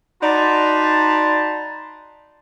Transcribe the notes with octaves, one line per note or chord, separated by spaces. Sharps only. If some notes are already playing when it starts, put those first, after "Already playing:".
D#4 F#4 D5 A5 B5 C6